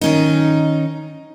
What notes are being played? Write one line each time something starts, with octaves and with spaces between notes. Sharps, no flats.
D#3 C#4 D#4